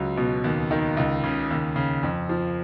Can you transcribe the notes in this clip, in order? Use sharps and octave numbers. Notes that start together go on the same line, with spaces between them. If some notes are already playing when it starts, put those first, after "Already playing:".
Already playing: C#2 F#3
B2
D#2
D#3
C#2
C#3
D#2
C#3
F2
F3